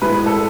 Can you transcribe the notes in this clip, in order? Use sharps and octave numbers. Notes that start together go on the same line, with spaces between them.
A2 G#3 B4
A4